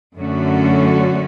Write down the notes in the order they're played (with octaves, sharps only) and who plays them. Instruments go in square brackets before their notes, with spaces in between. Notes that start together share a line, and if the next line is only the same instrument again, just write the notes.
[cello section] F#2 D3 A3 C#4 F#4